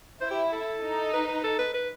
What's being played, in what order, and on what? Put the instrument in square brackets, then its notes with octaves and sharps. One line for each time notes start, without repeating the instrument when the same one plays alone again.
[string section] E4 [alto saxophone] C5
[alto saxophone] G4
A4
[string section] D#4
[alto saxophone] B4
B4
A4
B4
B4